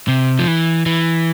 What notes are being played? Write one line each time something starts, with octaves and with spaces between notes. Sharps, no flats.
C3
F3
E3
E3